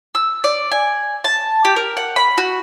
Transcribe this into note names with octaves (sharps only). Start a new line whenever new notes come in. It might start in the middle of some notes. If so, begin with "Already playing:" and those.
E6
D5
G#5
A5
G4
A#4
F#5
B5
F#4